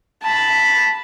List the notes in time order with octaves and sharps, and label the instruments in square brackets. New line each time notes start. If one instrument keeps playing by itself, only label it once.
[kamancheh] A5 B5